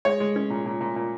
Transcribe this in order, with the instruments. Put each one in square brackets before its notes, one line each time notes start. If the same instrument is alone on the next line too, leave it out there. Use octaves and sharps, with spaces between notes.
[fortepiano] G#3 C#5
G#3
C#4
A#2
A#2
A#2
A#2